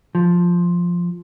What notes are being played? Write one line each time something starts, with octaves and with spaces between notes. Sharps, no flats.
F3